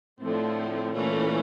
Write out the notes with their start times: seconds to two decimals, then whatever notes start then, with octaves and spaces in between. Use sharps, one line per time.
0.21 A2 D3 F3 A3 C4
0.94 A#2 E3 A3 C#4